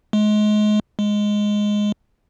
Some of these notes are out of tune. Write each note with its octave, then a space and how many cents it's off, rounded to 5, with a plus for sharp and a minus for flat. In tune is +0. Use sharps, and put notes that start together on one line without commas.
G#3 +30
G#3 +0